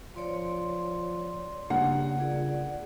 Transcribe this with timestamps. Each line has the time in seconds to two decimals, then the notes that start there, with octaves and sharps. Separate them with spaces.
0.16 F3 C#5 D5 C6
1.70 G2 C#3 A#3 F5 F#5
2.20 A#2 G#4 D5